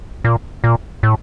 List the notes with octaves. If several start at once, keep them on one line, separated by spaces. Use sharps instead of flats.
A#2
A#2
A2